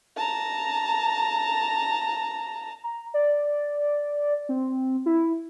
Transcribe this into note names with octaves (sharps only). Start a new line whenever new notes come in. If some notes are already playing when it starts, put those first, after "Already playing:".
A5 A#5
A#5
D5
C4
E4